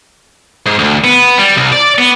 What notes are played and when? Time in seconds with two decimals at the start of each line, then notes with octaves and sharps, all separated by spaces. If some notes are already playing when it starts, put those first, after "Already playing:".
0.66 G#2
0.79 D2
1.04 B3
1.38 G3
1.57 C2
1.72 D5
1.98 B3